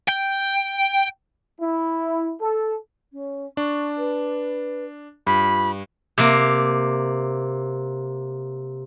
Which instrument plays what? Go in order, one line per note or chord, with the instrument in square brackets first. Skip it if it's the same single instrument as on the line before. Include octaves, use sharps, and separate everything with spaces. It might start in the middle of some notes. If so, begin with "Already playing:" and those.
[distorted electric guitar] G5
[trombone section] E4
A4
[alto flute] C#4
[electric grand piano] D4 [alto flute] C#6
[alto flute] B4
[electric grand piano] G2 [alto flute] F4 [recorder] B5
[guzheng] C3 A#3